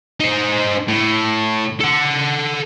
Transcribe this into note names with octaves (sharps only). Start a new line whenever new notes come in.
D#4 C5
A2
A4 F#5